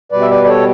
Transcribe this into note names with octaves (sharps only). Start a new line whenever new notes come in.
B2 G3 B4 D5
E5
B4 D5
D5
A4 C#5